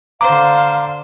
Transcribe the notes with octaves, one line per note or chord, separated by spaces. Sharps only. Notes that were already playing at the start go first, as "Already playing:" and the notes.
D3 C5 F5 A#5 D6